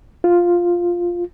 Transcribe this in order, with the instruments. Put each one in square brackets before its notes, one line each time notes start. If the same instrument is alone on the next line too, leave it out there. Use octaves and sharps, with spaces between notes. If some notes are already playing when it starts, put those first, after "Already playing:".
[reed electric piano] F4